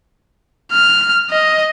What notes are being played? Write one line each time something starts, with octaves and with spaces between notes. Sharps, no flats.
F6
D#5